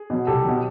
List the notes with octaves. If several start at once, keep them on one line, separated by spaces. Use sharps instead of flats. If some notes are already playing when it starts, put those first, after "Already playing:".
Already playing: G#4
B2 F#3
C2 G4 A4
B2 F#3